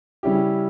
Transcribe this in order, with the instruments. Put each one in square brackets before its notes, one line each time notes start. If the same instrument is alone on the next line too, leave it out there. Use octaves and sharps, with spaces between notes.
[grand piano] C#3 G3 C#4 E4 G4